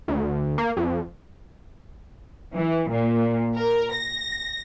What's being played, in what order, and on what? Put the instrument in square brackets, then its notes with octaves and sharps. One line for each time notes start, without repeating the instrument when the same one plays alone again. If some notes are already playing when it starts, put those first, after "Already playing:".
[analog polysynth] D2
A#3
F2
[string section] E3
A#2
A#4
A#6